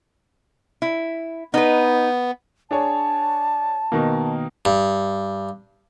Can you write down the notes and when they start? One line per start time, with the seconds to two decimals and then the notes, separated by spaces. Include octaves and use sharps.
0.82 E4
1.54 B3 D#4 B4
2.71 D4 G#4 C#5 A5
3.92 B2 D#3 A#3
4.65 G2